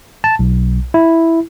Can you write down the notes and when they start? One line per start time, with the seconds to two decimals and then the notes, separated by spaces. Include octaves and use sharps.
0.24 A5
0.39 B1
0.94 E4